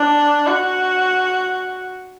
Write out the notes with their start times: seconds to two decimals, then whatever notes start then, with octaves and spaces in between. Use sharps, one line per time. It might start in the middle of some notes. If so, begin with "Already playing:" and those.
Already playing: D4
0.47 F#4